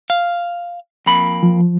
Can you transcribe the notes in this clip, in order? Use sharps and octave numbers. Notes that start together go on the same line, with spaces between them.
F5
F2 A#3 B5
F3